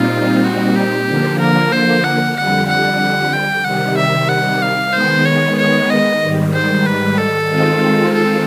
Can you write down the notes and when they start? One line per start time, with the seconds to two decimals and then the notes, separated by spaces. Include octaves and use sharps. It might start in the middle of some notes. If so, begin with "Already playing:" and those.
Already playing: A#2 G3 C4 D#4 F4
0.44 F#4
0.76 G4
1.08 D3 F3 A#3
1.40 A#4
1.72 C5
2.04 F#5
2.36 F2 D3 G3 F#5
2.69 F#5
3.33 G5
3.65 C3 D#3 G3 F#5
3.98 E5
4.29 F#5
4.62 F5
4.93 D#3 G#3 B3 C5
5.25 C#5
5.58 C#5
5.90 D#5
6.21 G#2 D#3 G3
6.54 C5
6.86 B4
7.18 A4
7.50 D#3 G#3 C4 F4
8.14 A4